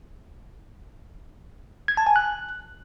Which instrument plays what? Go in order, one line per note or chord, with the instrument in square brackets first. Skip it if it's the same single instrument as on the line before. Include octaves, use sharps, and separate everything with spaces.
[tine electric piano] G#6
A5
G#5
F#6